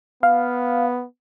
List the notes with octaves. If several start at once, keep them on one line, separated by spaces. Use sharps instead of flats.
B3 F5